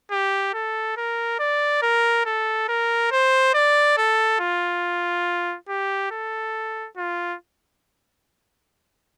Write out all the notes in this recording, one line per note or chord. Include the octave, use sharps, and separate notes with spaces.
G4
A4
A#4
D5
A#4
A4
A#4
C5
D5
A4
F4
G4
A4
F4